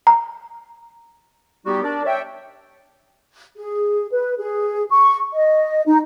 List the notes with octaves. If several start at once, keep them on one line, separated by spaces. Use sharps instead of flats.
A#5
G3 B3 D#4 F#4 G4
D4 A#4 D5
C#5 D5 E5 G5
G#4
B4
G#4
C#6
D#5
D#4